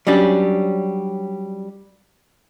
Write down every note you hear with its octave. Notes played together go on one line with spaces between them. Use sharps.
F#3 G3 C#4 D4 G4